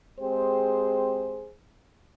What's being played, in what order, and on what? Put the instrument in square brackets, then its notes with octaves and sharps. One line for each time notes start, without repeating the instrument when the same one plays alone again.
[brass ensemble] G#3 C4 G4 G#4 C5